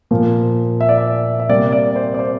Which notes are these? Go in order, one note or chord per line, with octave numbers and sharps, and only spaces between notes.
A#2 F3 A#3
E5
D5
E5
E5
C3 G3 A#3 D5
D5
C5
D5
C5